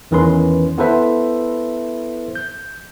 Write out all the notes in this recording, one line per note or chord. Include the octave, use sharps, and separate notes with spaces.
E2 D#3 E3 C#4 B4 C6
B3 E4 A4 B4 C5 E5
G6